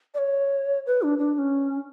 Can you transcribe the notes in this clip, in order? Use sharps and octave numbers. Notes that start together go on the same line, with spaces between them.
D5
C#5
B4
D4
D4
D4
C#4